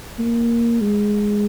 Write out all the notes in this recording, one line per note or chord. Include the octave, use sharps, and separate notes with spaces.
A#3
G#3